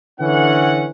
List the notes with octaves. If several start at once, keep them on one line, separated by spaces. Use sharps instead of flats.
D3 E3 C#4 F#5